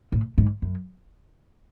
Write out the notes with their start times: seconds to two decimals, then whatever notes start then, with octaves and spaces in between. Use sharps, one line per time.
0.12 A2
0.38 G#2
0.62 F#2